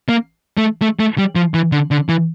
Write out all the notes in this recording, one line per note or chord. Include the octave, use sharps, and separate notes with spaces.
A#3
A3
A3
A3
G3
F3
E3
D3
D3
E3